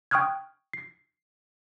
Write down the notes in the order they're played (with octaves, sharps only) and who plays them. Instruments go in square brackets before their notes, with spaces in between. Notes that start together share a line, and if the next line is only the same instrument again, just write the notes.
[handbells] G5 C#6 D#6 F6 F#6 G#6
C7